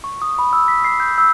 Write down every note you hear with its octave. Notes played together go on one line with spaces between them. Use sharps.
C#6
D#6
B5
E6
B6
C7
G6
E6